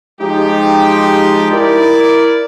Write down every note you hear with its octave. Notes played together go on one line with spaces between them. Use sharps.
F3 G#3 D#4 G4
E4 A#4 D5